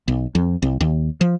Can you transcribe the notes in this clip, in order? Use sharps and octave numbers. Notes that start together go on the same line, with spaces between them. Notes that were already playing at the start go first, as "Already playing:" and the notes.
B1
F2
C2
D#2
F3